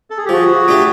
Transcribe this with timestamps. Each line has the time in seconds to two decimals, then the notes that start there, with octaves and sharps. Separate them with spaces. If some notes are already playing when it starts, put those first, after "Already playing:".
0.10 A4
0.18 G#4
0.25 G4
0.29 F3 F#4 G#4
0.68 A3 D4 G4